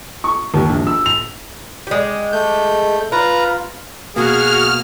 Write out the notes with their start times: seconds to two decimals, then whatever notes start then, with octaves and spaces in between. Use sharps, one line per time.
0.24 C#6
0.54 D#2
0.69 A#1
0.87 E6
1.06 F7
1.87 G#3 G4
2.33 A3 G6
3.12 F4 B4 A#5
4.16 B2 A#3 F#4 G#4 F6